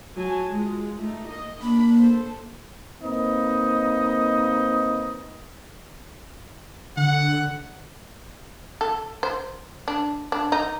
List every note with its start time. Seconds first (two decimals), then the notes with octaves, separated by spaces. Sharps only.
0.16 F#3 G#5 A5
0.48 G#3 F4
1.00 A3 D#4
1.28 A#3 D#5
1.62 A#3 D4 B5
1.99 A4 C5
3.02 A#3 C4 D#4 B4 D#5
6.97 D3 F#5
8.81 A4
9.23 C5
9.88 D4
10.32 D4
10.52 D#4